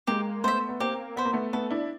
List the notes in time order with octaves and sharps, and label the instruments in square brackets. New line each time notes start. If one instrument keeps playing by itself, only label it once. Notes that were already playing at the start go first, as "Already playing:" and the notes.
[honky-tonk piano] G#3 A#3 [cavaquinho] G4
[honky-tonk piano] A3 B3 [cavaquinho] C5 E5
[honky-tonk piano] B3
[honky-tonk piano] A#3 C4 [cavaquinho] G4
[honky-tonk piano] B3 [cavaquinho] C5 E5
[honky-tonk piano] A#3
A3 B3
[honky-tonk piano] A3 B3 [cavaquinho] A4
[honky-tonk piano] D4 E4